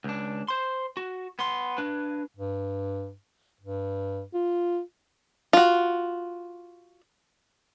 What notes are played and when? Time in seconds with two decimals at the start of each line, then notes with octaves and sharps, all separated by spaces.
0.04 C#2 D4
0.48 C5 C6
0.97 F#4
1.39 B3 C6
1.78 D4 B4
2.37 G2
3.61 G2
4.34 F4
5.53 F4 F#4